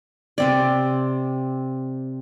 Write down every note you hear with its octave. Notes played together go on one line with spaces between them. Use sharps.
C3 C4 D5